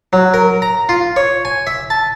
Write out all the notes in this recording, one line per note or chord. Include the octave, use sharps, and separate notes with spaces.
F#3
A#4
A#5
F4
C#5
G#5
E5
A5